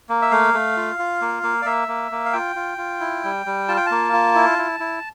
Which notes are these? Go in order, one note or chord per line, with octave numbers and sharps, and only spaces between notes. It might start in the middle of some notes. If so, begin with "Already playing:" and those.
A#3
E5
A3 F5
A3
F4
F4
A#3
A#3
D5
A#3 E5
A#3
A#3
F5
F4 G5
F4
F4
E4
G3
G3
F4 A5
G5
A#3 A5
F4
E4
E4
E4